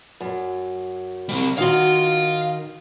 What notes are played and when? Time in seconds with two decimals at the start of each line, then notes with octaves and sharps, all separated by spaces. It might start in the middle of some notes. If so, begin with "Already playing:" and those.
0.20 F#2
1.29 G3 C4
1.58 D#3 F#4 F5 C6